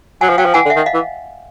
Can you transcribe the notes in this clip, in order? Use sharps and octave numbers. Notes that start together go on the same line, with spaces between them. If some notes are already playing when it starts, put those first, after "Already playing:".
F#3 F#5 G#5
F3
F#3 F5 G5
F3
E3 F#5 G#5
D3
E5 F#5
D#3
D#5 F5
E3